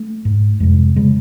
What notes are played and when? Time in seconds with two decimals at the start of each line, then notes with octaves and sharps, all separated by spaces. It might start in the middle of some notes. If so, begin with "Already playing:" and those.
Already playing: A3
0.25 G#2
0.60 F2 C3 G#3
0.96 C#3 G#3